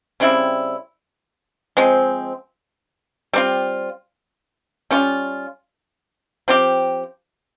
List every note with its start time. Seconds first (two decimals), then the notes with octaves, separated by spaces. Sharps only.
0.20 C#3 G3 C4 E4
1.77 F3 G#3 C4
3.33 G3 C4 F4
4.91 G3 C#4 F4
6.48 F3 C4 G4